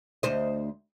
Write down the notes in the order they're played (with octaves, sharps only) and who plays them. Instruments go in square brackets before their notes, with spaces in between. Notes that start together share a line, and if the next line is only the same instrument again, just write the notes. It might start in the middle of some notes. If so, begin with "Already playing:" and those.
[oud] D2 C5 D#5